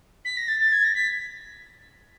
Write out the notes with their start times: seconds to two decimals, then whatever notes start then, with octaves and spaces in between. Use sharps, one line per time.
0.24 B6
0.37 A#6
0.48 A6
0.59 A6
0.72 G#6
0.84 A#6
0.95 B6